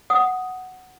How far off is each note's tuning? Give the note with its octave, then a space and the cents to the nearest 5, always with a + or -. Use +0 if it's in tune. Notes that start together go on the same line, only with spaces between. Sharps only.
F#5 +0 D#6 +0